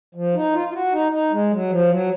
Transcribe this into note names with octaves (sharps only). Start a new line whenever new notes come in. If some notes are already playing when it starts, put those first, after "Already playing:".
F3
D#4
F4
F4
F#4
D#4
D#4
G#3
F#3
F3
F#3